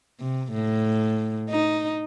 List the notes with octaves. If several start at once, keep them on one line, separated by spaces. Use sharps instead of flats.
C3
A2
D#4